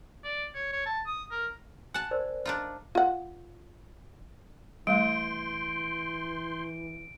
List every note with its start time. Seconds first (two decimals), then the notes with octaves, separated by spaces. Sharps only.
0.24 D5
0.55 C#5
0.73 C#5
0.86 A5
1.06 D#6
1.31 A#4
1.94 F#5 G#5 A5
2.11 A#4 C5 D5
2.45 D4 D#4 F4
2.95 F4 F#5
4.87 E3 G3 A3 C6 G6 D7